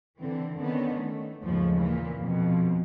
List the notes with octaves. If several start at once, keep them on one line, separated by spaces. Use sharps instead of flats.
D3 E3 C4
D3 D#3 B3 C#4
A3
D#2 G#2 C#3 F3 A3
A#2 E3 A#3
F2 B2